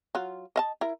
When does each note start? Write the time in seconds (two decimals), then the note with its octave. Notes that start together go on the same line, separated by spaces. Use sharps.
0.15 F#3 F4
0.56 D#5 F5 A5
0.81 E4 A#4